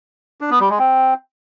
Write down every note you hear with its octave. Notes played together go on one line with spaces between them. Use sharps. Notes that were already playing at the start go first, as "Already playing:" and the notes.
D4
B3
G3
G#3
C4